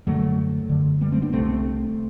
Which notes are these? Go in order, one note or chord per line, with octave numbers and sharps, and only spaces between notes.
F#2 D3 F#3 A3
F#2 D3
G3 B3
A3 C4
B3 D4
C2 C3 A3 C4